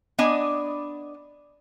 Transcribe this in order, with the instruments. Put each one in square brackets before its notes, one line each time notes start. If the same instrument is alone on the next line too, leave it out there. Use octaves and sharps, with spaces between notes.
[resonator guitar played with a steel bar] B3 D4 D5 D#5 G#5